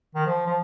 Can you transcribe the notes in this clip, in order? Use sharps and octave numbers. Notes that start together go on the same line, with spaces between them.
D#3
F3
F3